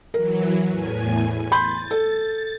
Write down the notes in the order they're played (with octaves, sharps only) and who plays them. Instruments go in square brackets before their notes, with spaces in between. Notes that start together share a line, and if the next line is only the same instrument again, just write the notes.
[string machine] E3 F#3 [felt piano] A#4
[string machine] E2 A2 G#5
[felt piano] B5 C6 G6 [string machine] A6
[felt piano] A4